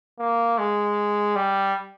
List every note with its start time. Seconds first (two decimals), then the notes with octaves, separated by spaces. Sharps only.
0.19 A#3
0.58 G#3
1.36 G3